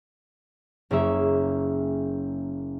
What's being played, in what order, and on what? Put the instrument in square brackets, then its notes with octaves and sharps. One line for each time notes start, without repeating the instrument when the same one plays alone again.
[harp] F#1 A#3 C#4 G#4 E5